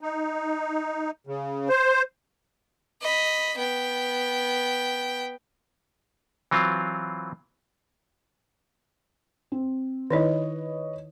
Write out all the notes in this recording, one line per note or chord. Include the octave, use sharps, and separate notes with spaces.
D#4
C#3
C5
D#5 B5
B3 G5
E3 F#3 C4 F4
C4
D#3 D#4 E4 B4 C#5 D#5